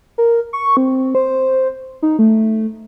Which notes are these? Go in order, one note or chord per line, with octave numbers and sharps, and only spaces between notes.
A#4
C#6
C4
C5
D#4
A3